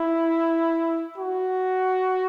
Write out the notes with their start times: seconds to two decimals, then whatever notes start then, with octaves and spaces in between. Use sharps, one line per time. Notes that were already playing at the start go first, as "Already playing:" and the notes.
Already playing: E4
1.18 F#4